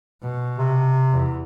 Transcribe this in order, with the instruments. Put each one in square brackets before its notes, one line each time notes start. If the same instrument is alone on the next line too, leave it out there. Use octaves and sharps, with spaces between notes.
[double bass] B2
[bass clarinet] C3
[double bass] E2